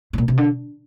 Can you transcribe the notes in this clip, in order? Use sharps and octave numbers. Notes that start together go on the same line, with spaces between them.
A2
A#2
C3
D3